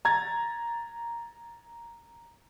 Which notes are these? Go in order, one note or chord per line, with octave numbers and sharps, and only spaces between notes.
A#5 G#6 A6